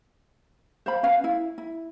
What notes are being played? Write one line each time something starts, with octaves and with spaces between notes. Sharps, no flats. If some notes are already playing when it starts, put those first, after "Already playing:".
C5 F5 B5
C#4 B4 F5
E4
E4